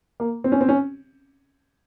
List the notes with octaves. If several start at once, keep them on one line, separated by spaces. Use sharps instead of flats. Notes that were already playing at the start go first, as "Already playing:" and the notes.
A#3
C4
C#4
C4
C#4